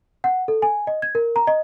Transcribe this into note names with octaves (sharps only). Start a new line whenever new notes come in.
F#5
A4
G#5
D#5
G#6
A#4
A#5
D#5